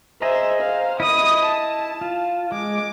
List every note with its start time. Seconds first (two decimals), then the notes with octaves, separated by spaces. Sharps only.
0.22 G#4 C5 D#5 E5 A#5
0.61 C5 F5
1.00 E4 D#5 B5 D#6
1.45 A5
2.01 F4
2.52 G#3 D6